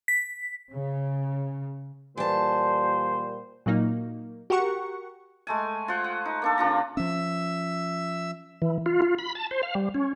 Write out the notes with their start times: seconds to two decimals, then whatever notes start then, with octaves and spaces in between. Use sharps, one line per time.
0.08 B6
0.71 C#3
2.17 A#2 E3 G3 C5 A5
3.66 A#2 F#3 A#3 D#4
4.50 F#4 G4 A#4 F#5 C#6
5.47 G#3 A3 G#5
5.88 F4 C5 F#5
6.04 F#5
6.26 D#4
6.42 A#3 D4 A4
6.58 C#3 D4 F4 A#5
6.97 F3 C#4 E5 E6
8.62 E3
8.86 F4
9.02 F4
9.19 B5
9.35 A5
9.51 C5
9.63 F5
9.75 G3
9.95 C#4